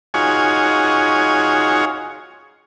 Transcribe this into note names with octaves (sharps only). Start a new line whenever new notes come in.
D#4 F4 F#4 G#4 C#5 G#5